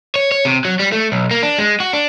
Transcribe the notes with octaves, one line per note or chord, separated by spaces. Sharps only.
C#5
C#5
C3
F#3
G3
A3
B1
A#3
D4
G#3
F#4
D4